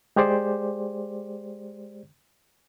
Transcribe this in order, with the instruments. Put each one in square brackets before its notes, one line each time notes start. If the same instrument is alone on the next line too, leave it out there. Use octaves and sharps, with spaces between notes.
[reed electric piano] G#3 G4 G#4 C5 D5